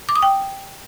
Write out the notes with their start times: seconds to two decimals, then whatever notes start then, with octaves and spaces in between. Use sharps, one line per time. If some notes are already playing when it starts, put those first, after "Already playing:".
0.09 D6
0.16 D#6
0.22 G5